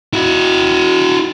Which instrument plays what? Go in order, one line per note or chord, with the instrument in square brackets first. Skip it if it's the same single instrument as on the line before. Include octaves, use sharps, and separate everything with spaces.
[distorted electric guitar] E4 F#4